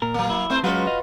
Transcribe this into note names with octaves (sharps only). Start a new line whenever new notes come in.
A#2 A#4
F#3 A#3
E4
A3 C4 C5
F#3 G#3 C#4 F4 F#4 B4
D#5 F5